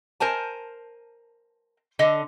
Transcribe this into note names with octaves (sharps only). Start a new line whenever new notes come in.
A#4 C5 G#5 A5
D3 A4 D#5